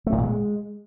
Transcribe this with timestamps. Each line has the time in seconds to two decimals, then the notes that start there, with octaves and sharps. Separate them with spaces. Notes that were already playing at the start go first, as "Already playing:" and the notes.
0.06 A3
0.12 A2
0.18 A#2
0.24 G#3